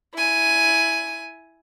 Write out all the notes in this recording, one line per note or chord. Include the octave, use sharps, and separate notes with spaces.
E4 G#5